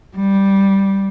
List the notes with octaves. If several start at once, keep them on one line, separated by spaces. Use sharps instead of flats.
G3